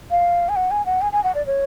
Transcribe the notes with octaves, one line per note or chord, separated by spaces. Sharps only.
F5
G#5
F#5
G#5
F#5
G#5
G#5
F#5
D5
C#5